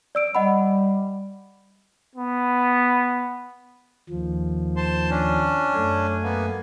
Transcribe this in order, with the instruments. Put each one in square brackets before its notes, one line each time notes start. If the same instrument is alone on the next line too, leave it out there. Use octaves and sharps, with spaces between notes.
[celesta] D5 E6 D7
[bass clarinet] G3 [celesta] D#5 F#5 B5
[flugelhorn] B3
[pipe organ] D#2 F3
[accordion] C5 A5 C6
C#4 D4
[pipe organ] F#2 A3 G#5
[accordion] A#3 B3